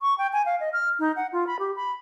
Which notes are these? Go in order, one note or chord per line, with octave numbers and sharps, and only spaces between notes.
C#6
G5
G#5
F5
D#5
F6
D#4
F#5
F4
B5
G4
B5